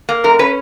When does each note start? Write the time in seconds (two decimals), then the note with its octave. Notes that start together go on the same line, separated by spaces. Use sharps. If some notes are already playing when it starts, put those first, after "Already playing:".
0.09 A#3
0.24 F#2 A#4
0.39 C#4 B4